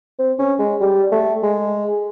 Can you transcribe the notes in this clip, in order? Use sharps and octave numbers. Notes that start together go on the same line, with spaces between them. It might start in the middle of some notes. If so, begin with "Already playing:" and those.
C4
C#4
G#3
G3
A3
G#3